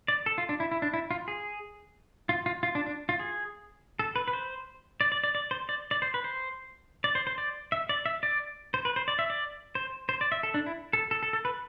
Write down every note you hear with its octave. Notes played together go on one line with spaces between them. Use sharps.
D5
A4
F4
D4
E4
E4
D4
E4
F4
G#4
F4
F4
F4
D4
D4
F4
G#4
A4
B4
B4
C5
D5
D5
D5
D5
C5
D5
D5
C5
B4
C5
D5
C5
C5
D5
E5
D5
E5
D5
C5
B4
C5
D5
E5
D5
C5
C5
D5
E5
A4
D4
E4
A4
A4
A4
A4
B4